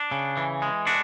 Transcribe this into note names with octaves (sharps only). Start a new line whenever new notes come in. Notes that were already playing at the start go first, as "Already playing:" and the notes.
Already playing: D4
C#3
E3
G#3
D4 F#4